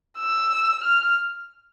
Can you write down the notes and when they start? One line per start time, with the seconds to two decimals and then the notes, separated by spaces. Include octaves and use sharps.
0.19 E6
0.84 F6